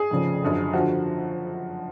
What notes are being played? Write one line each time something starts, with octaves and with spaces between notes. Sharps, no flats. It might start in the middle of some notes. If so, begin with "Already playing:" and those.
Already playing: G#4
F1 F2 C#3 F3
F#1 F#2 D3 F3
D3 F3 F#4